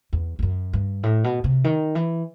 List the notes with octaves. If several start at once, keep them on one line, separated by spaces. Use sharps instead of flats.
E2
E2
F#2
G2
A2
B2
C3
D#3
E3